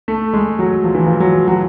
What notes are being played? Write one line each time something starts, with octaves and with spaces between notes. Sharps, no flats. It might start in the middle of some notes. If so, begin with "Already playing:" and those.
A3
G#3
F#3
F3
E3
F3
F#3
F#3